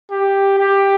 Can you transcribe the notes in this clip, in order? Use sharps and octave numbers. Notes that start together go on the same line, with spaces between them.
G4
G4